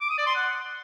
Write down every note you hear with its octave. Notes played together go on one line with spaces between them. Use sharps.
D6
D#6
D5
C6
F#5